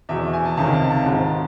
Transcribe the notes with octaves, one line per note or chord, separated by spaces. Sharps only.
E2 B2 E5
G#5
A5
C#2 C3 D#3 A5
A5
A5
G#2 D#3